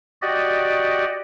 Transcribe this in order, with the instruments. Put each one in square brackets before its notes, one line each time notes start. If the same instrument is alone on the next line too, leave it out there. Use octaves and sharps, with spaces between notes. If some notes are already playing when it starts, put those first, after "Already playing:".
[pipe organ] F#4 G4 D5 D#5